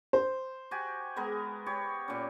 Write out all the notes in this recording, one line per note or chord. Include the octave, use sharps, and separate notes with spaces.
C5
F#4 G4 G#5
G#3 B3 A#4
G4 C#5
A#2 C#4